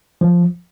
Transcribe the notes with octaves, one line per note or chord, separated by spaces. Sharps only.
F3